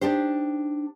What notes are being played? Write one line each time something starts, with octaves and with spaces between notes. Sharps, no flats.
D4 D#4 G4 C5